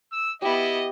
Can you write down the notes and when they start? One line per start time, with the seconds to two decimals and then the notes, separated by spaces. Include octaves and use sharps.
0.12 E6
0.42 B3 E4 G4 D#5